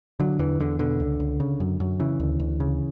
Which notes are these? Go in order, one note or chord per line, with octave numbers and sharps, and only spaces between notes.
D3 F#3
E2 E3
E2 D3
B2 D3
C#2
C#2
C#3
F#2
F#2
C#3 E3
D2
D2
C#3